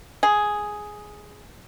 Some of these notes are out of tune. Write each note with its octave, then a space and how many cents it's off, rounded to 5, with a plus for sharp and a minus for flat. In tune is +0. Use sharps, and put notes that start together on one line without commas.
G#4 +5